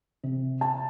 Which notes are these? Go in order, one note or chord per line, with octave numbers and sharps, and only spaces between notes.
C3
A5